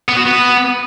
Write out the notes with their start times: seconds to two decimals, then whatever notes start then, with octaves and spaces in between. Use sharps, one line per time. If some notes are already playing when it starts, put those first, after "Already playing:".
0.09 B3
0.17 F#4
0.25 B3